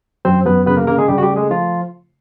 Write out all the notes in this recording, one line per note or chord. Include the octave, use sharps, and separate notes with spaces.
F#2 C4 C5
F#2 B3 B4
C#3 B3 B4
A#3 A#4
C#3 A#3 A#4
G#3 G#4
C#3 G3 G4
F#4
G3 G4
A3
G#3 G#4
F3 F4